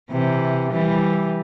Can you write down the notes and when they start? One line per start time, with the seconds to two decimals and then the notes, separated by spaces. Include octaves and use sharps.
0.11 C3 E3
0.72 E3 G3